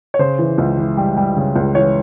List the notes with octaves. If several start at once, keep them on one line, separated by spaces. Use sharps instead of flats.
C#5
C#3 C5
E3
C#2
E3
G3
G3
C#3
C#2
E3 C#5